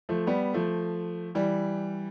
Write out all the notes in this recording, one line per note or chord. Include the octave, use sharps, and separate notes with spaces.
F3 A3
G3 B3
F3 A3
E3 G3